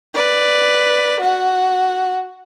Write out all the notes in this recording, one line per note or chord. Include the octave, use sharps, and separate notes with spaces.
B4 D5
F#4 F#5